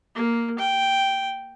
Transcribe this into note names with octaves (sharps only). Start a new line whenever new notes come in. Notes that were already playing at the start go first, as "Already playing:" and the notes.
A#3
G5